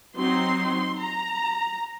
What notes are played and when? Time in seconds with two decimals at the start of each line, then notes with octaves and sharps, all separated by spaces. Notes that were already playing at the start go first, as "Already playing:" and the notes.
0.17 F#3 C4 D#4 C6
0.99 A#5